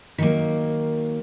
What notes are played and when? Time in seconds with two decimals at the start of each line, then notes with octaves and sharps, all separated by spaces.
0.18 D#3 F#3 A#3